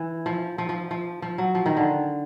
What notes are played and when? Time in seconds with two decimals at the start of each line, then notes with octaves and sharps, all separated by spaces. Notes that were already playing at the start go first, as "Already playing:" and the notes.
Already playing: E3
0.26 F3
0.58 F3
0.69 F3
0.91 F3
1.22 F3
1.38 F#3
1.55 F3
1.66 D#3
1.77 D3